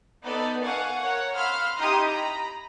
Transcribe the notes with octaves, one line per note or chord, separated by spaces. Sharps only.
B3 D#4 A4 D5
F5 F#5 G#5 C#6
A#4 C#5 F#5
F5 F#5 B5 C6 E6 F6
D#4 E4 G4 A#5 C6 D#6
A#5 B5